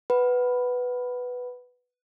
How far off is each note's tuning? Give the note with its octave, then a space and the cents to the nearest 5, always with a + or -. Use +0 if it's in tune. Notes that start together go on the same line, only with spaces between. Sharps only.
B4 +5 F#5 +10 B5 +0